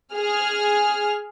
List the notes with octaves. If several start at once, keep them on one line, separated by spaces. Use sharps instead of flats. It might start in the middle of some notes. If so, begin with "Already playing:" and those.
G#4 F6